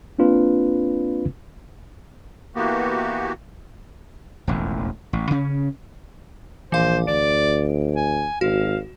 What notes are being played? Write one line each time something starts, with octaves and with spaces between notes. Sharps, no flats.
A#3 C4 D4 F4 B4
E3 A#3 B3 F#4 G4
E1 A1 F2
A1
C#3 C#4
A#1 E3 C5 F5
D2 D5 D7
G#5
G#1 F#4 F5